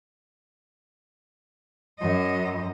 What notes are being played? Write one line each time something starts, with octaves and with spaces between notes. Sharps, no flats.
F#2 D#5